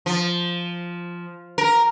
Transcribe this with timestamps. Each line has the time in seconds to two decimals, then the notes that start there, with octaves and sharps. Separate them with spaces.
0.06 F3
1.58 A#4